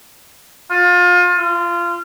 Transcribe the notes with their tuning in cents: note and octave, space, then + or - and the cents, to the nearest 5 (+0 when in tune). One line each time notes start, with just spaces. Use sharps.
F4 +30
F4 -20